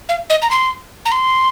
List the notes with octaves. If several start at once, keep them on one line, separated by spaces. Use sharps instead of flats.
F5
D#5
A#5
C6
A#5
C6